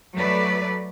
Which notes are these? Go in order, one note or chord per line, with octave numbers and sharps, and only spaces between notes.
F#3 A3 B4 D5